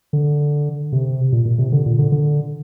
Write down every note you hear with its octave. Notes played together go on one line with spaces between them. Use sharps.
D3
C3
A#2
A#2
C3
D3
A#2
D3
D3